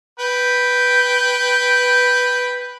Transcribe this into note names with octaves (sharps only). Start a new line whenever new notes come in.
B4 G5